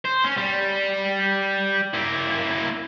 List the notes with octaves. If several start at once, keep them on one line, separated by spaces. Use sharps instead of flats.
C5
C#4
G3
A#3 E4